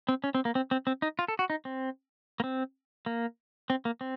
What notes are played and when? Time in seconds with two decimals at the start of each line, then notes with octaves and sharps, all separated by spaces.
0.09 C4
0.24 C#4
0.35 C4
0.45 A#3
0.55 C4
0.71 C4
0.87 C4
1.02 D#4
1.19 F4
1.28 A4
1.39 F#4
1.50 D#4
1.65 C4
2.40 A#3
2.44 C4
3.06 A#3
3.70 C4
3.85 A#3
4.01 C4